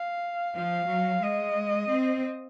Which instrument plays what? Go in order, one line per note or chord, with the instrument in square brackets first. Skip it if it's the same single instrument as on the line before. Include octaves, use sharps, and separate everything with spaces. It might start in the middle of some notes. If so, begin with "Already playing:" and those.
Already playing: [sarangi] F5
[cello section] F3 [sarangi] F5
[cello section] F#3
[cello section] G#3 [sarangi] D#5
[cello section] C4